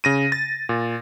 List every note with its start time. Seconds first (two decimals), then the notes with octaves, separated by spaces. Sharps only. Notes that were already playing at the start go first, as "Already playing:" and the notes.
0.04 C#3 A#6 D#7
0.32 A6
0.69 A#2